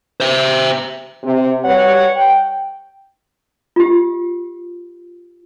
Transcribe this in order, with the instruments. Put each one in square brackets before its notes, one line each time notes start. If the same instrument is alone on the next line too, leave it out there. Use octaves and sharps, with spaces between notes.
[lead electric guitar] C5 E5
[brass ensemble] C3
G3 G4 B4 C#5 F#5
G5
[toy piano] F4 G4